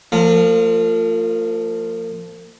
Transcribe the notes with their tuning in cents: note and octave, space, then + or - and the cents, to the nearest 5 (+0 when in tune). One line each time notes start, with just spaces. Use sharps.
F3 +0 A#3 -45